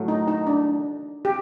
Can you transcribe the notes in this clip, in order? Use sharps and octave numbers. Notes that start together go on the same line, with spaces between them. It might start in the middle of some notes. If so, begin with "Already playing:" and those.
Already playing: A2 F#3 A3
D#4
D#4
D4
G4